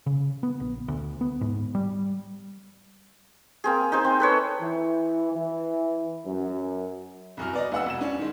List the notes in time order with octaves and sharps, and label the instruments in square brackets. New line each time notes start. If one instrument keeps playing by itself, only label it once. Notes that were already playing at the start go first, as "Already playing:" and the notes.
[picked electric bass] C#3
B3
A#1
D2
B3
G#2
G3
[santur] A#3 C4 G#4
D#4 G#4 C5
C4
A4 B4 C#5
[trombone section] E3
E3
F#2
[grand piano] C2 F#2 F6
B3 D5 D#5
F1 F#5 E6
E1 E7
C#4 D4
D#3 G#3